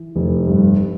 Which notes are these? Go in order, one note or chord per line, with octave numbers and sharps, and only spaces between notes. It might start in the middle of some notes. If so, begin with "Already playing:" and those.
Already playing: E3
F1
G2